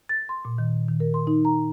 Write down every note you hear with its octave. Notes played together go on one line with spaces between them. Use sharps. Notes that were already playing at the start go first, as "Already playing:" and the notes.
A6
C6
A#2
D#3
D#3
A#4
C6
D#4
A#5